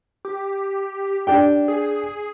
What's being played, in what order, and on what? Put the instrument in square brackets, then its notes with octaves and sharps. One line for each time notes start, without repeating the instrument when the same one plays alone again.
[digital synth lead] G4
[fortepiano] D4 G4 G5
[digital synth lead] G#4